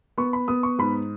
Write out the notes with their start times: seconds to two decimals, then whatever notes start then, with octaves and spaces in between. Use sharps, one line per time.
0.18 B3 C#6
0.33 B5
0.48 B3 D#6
0.63 C#6
0.79 G#2 B5